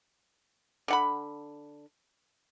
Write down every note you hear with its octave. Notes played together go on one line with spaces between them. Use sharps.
D3 F#5 B5